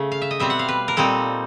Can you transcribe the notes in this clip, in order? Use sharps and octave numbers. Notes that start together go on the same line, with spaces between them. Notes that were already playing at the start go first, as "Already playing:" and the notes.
Already playing: C#3 A3
F5
E5
D#5
B2 G3 C4 E5
F#5
F5
B4
A#4
A#2 G3 C4 D#4 A4